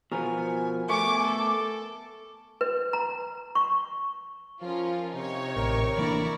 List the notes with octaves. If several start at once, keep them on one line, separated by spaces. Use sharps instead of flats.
B2 F3 B3 A#4 G#5
A3 B3 G#5 C#6 D6
A4 D6
B4
A#5
C#6
F3 C#4 F4 A#4
C3 D#4 C#5
A1 A#4 C#6
A2 E3 A#3 D4 E4 D5 A#5